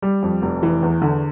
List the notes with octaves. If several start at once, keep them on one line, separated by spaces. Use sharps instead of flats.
G3
F2
F1
E3
E2
D3